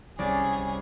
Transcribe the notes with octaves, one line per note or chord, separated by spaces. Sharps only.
C2 C#4 G#4 D5 A6